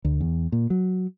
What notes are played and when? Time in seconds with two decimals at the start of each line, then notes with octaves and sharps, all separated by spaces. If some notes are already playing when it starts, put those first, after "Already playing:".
0.05 D2
0.20 E2
0.52 A#2
0.70 F#3